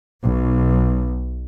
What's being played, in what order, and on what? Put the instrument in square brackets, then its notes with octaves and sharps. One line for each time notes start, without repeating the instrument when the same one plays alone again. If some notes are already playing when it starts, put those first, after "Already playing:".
[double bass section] B1